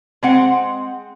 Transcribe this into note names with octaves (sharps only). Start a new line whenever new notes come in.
G#3 C4 F#5